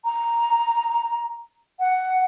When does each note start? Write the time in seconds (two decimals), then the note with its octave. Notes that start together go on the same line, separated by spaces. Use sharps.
0.05 A#5
1.80 F#5